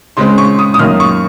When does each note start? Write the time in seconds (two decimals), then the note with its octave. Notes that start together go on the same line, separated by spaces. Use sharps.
0.17 C#3 G#3 C4 C6
0.38 C#6
0.59 D#6
0.74 D#6
0.79 F#2 D#3 A#3 F6
1.00 C#6